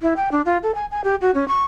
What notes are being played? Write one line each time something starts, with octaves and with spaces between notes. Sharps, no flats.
E4
G5
D4
F4
A4
G#5
G#5
G4
F#4
C#4
C#6